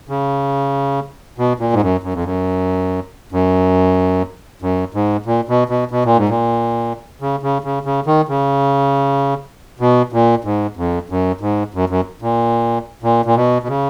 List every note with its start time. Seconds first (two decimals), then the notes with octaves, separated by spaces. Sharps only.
0.09 C#3
1.38 B2
1.60 A#2
1.73 G#2
1.82 F#2
2.03 F#2
2.14 F2
2.24 F#2
3.32 F#2
4.62 F#2
4.94 G#2
5.26 A#2
5.49 B2
5.69 B2
5.91 B2
6.05 A#2
6.17 G#2
6.29 A#2
7.21 C#3
7.43 C#3
7.64 C#3
7.85 C#3
8.06 D#3
8.29 C#3
9.80 B2
10.13 A#2
10.44 G#2
10.76 F2
11.10 F#2
11.41 G#2
11.74 F#2
11.90 F#2
12.22 A#2
13.03 A#2
13.25 A#2
13.36 B2
13.63 B2
13.68 C#3